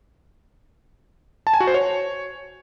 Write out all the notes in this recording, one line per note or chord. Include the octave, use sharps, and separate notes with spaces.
A5
G#5
F#4
C5
C#5